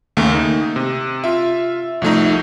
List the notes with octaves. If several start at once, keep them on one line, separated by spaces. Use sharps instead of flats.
D#2 C#3 A3 A#3
D#4
C3
F4 E5
C2 F3 A3 D#4